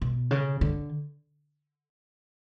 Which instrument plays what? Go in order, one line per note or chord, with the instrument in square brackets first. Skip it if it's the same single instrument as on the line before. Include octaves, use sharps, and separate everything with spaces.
[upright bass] B2
C#3
D3